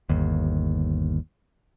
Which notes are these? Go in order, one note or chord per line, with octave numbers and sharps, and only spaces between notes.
G1 D#2